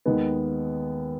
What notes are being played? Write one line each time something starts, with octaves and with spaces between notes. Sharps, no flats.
D#2 D#3 G#3 B3